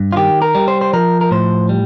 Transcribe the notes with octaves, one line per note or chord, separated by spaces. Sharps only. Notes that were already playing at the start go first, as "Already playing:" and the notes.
Already playing: G2
F4
D#3 G4
A#4
G3
C5
C5
F3 A#4
A#4
A2 C5
G3